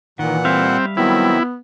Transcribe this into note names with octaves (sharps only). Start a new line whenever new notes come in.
A#2 D#3 E3 F#5
G3 C4 E5 F5
D#3 F#3 B3 C4 E4